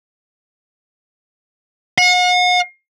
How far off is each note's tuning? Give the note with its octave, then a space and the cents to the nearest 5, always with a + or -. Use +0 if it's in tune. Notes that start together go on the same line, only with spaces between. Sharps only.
F#5 -40